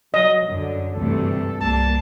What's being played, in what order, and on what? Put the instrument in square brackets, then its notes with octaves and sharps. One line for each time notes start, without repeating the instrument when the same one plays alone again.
[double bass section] F#3 [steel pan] D#5
[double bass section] F#2 [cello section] D3
[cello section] D2 C3 [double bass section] G2 E3 A3 [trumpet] A4
[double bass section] C2 [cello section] G3 A#3 [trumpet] A5